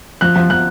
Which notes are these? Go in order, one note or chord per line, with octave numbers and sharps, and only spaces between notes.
F3 F#6
F3
F3 F#6